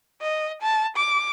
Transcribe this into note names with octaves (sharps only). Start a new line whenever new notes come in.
D#5
A5
D6